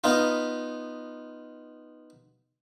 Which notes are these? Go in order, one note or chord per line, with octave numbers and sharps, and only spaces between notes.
B3 D#4 F4